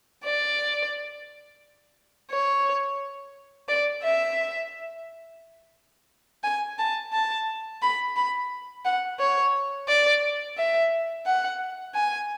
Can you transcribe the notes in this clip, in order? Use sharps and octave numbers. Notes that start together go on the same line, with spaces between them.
D5
C#5
D5
E5
G#5
A5
A5
B5
B5
F#5
C#5
D5
E5
F#5
G#5